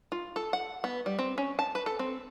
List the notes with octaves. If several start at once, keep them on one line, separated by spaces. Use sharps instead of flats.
F4
A4
F#5
B3
G3
C4
C#4
A5
B4
A4
C4